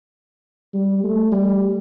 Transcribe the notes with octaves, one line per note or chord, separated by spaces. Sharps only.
G3
A3
G3